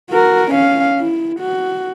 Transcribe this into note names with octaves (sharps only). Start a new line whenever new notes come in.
F#4 A#4
C#4 F5
E4
F#4